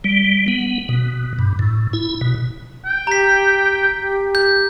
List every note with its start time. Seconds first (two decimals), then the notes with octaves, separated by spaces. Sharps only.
0.04 G3
0.48 B3
0.89 B2
1.39 G2
1.59 A2
1.93 E4
2.21 B2
2.85 G5
3.07 G4 A#5 B6
4.00 G4
4.35 G6